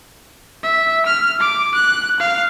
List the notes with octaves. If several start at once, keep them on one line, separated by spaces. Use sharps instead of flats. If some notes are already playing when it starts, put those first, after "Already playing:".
E5
F6
D6
F#6
F5